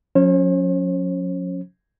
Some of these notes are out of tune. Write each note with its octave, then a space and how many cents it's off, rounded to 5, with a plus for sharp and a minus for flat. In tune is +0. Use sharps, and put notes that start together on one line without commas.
F#3 -45 C#4 +0 C5 +45